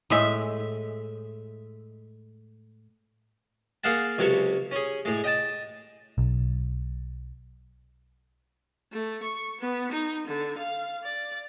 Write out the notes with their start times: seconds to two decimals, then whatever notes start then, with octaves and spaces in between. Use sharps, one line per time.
0.10 A2 G#3 E5
3.84 A#3 G#4 F5 F#5 A5
4.18 C#2 C3 F#3 A4 C#6
4.71 C#4 G#4
5.05 A2 G#3
5.24 D#5 G5 A5
6.18 B1
8.92 A3
9.23 C#6
9.61 B3
9.92 D#4
10.27 D3
10.58 F5
11.04 D5